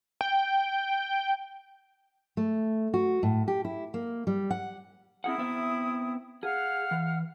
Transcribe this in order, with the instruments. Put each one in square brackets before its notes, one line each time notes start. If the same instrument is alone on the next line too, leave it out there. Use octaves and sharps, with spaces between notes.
[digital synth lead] G5
[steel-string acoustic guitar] A3
F#4
A2
G4
E4
A#3
G3
F#5
[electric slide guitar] C4 G#4 F#5 [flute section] E4 D#6
[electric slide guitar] B3 C4 E5
[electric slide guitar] G#4 [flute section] F5 F#5 F6
[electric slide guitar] E3